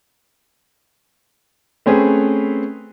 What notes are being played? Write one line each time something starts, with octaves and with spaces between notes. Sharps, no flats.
A3 C4 C#4 G#4 B4